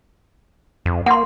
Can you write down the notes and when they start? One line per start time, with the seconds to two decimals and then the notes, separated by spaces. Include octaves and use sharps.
0.86 F2
1.06 A#3 F#5 C6